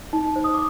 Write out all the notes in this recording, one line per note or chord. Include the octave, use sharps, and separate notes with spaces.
D#4
C5
D#6
D6